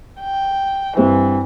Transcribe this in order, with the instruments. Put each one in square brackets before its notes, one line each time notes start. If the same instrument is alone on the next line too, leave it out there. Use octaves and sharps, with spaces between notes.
[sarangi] G5
[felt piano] G2 C4 [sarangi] E3